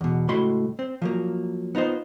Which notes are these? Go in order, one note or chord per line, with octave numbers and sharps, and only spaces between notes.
E2 B2
C#2 A2 F#4 B5 C6
C4
F3 F#3 A#3
B3 D#4 F4 C5